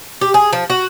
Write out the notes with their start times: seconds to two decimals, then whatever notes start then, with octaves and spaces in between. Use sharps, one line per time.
0.21 G4
0.34 G#4
0.53 F3
0.70 F#4